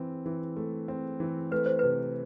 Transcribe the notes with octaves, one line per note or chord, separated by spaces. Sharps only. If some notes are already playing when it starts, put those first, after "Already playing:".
Already playing: E3 C4
E3
A3
C4
E3
A3 B4
C5
C3 B4